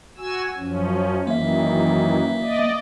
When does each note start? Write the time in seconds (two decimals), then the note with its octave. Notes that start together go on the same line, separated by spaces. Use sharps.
0.17 F#4 G#5 E6
0.57 F#2 F3 C#4
1.27 F#2 D#3 E3 A#3 E5
2.41 D5 D#5